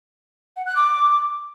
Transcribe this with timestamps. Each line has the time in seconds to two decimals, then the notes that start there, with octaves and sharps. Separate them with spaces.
0.56 F#5
0.66 F#6
0.76 D6